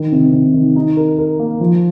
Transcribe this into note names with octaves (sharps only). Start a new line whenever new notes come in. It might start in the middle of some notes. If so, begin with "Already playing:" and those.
Already playing: D#3
C3
C3
D#3
D#4
A#4
A#4
A#3
F3